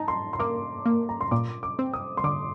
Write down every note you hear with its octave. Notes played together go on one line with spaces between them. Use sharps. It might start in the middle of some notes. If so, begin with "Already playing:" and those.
Already playing: D#4 A5 A#5
C6
C6
A#3 D6
A#3
A#5
C6
A#2 D6
D6
C4
D#6
C6
D3 D6